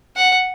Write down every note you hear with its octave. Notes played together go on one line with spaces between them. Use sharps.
F#5